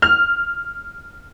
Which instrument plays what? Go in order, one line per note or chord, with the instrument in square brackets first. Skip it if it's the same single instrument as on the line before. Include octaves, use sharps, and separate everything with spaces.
[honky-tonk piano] F6